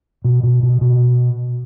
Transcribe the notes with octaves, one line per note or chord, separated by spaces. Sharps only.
B2
B2
B2
B2